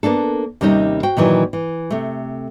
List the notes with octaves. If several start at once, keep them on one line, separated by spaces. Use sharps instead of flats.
A#3 B3 D4 A4
D#2 C3 G3 C#4 D#4 D#5
F#4 C5 G5
A#2 D#3 E3 F#3
E3
C3 A3